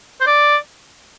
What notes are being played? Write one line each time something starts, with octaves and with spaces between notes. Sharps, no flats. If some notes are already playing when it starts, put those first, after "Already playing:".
C5
D5